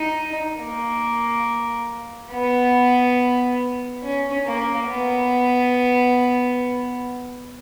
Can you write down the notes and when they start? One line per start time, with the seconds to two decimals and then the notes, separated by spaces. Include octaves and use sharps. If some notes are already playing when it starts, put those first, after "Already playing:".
Already playing: D#4
0.59 A#3
2.31 B3
4.03 C#4
4.46 A#3
4.89 B3